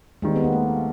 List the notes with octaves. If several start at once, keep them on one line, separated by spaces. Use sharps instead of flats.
D#2 D#3 G3 G#3 C4
B3
A#3
A3